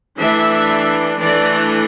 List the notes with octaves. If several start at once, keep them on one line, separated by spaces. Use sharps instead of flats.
E3 A3 D4 E5
E3 A3 D4 D5